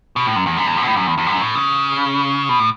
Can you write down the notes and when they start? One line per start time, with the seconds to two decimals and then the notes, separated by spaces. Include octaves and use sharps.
0.16 B2
0.27 A2
0.36 F#2
0.46 E2
0.57 F#2
0.67 E2
0.77 F#2
0.82 B2
0.87 A2
0.96 F#2
1.07 E2
1.18 E2
1.27 F#2
1.41 A2
1.55 C#3
2.49 B2
2.59 A2